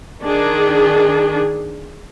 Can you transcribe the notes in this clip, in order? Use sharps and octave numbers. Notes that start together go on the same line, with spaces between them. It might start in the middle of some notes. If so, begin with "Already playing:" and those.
D#3 D4 G#4